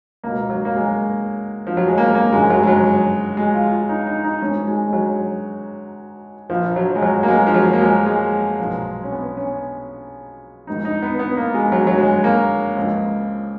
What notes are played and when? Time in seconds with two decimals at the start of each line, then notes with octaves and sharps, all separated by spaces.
0.24 C#2 B2 A#3
0.50 F#3
0.65 A#3
0.76 G#3
1.67 F3
1.77 F#3
1.87 G#3
1.98 A#3
2.15 A#3
2.32 G#1 F#2 C#3 F3 G#3
2.50 F#3
2.63 G#3
2.67 F#3
3.37 G#3
3.54 F4
3.72 F4
3.89 D#4
4.07 D#4
4.24 D#4
4.41 G#1 G#2 D#3 C#4
4.67 G#3
4.88 G#3
4.93 F#3
6.50 A#1 A#2 F3
6.76 F#3
6.95 G#3
7.02 F#3
7.23 A#3
7.28 G#3
7.47 F3
7.54 F#3
7.73 A#3
7.81 G#3
8.06 G#3
8.59 B1 A#2 F3
9.03 C#4
9.12 B3
9.37 C#4
10.67 A#1 G#2 D#3 D#4
10.85 D#4
11.02 B3
11.19 B3
11.37 A#3
11.54 G#3
11.72 F#3
11.87 F#3
11.98 G#3
12.24 A#3
12.76 C#2 C#3 F3